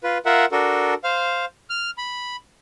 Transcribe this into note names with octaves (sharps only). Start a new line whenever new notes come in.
F4 B4
F4 A#4 E5 F#5
D4 F#4 A4 A#4
C5 F5
F6
B5